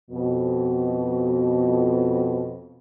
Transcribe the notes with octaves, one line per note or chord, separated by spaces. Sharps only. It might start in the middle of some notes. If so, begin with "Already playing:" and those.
F2 B2